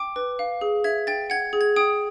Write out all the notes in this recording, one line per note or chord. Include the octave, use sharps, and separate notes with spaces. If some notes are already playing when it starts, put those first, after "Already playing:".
Already playing: G5 D6
B4
F5
G#4
E5 G#6
G5 A6
F#5 G#6
G#4
G#6
G5 D#6